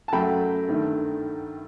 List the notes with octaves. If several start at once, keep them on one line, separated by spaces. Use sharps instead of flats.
A5
F#2 F#3 A3 G5 B5
G2 D#3 A3